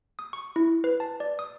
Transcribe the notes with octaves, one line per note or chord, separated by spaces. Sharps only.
D#6
C#6
E4
B4
A5
D5
D#6